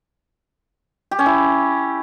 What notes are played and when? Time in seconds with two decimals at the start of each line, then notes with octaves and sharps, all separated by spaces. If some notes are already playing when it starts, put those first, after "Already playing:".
1.11 G4
1.19 C#4
1.26 E4